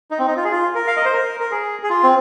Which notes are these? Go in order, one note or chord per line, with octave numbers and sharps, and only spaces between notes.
D#4
C4
D#4
F4
G#4
F4
A#4
F5
D#5
C5
A#4
A#4
G#4
G#4
F4
C4